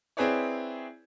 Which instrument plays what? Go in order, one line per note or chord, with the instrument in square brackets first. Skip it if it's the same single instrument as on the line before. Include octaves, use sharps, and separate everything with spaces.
[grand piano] C4 E4 G#4 B4 C#5 D5